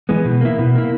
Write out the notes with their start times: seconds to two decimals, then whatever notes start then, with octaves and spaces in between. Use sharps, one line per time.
0.09 E3 G#3 B3
0.25 B2
0.41 A#3 E4
0.59 B2
0.75 A#3 E4